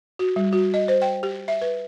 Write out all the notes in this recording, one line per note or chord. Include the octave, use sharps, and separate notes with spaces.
F#4
G3
F#4
D#5
C5
G5
G4
E5
B4